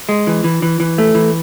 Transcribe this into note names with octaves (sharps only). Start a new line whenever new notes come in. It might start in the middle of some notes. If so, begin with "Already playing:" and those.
G#3
E3
E3
E3
E3
A3
E3